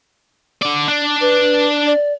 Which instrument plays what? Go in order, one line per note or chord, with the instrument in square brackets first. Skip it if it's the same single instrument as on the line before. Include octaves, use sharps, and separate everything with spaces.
[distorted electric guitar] D3 D5
D4
[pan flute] B4
D5